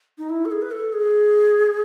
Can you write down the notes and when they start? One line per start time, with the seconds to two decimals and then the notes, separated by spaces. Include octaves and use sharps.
0.18 D#4
0.29 E4
0.45 A4
0.51 G#4
0.62 B4
0.71 A4
0.93 G#4